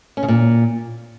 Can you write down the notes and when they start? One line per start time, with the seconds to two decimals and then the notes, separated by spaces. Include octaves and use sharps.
0.17 C#4
0.23 C#3
0.28 A#2